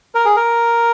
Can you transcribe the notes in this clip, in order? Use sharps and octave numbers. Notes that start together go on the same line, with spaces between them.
A#4
G#4
A#4